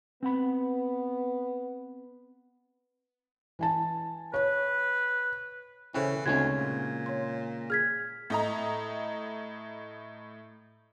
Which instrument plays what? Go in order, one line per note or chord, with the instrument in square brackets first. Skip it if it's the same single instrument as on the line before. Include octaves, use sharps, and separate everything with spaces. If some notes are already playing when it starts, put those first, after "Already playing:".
[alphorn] B3 [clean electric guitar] C4 F#5 B5
[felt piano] E3 G#5 A5
[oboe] B4 [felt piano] C#5
[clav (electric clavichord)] C#3 C#4 [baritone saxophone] E3 [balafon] A4 C5 G5
[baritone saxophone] D2 [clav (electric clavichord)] C#3 G#3 C#4 [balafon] C4 D#4 [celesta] G#6
[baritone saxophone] A#2
[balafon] C#5 C6
[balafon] G#4 [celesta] F6 G#6 B6
[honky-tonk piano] A2 D#5 A#5